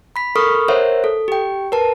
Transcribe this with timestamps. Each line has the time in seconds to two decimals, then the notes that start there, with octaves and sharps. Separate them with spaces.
0.16 B5 B6
0.36 A4 A#4 B5 C#6 D#6 F6
0.68 A#4 C5 C#5 E5 F#5
1.04 A4
1.28 G4 G5
1.72 A#4 B4 A5